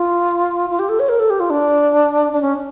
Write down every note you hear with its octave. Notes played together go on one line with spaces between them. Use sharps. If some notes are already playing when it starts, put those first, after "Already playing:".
Already playing: F4
F4
G4
A4
C#5
A#4
A4
G4
F4
D4
D4
C#4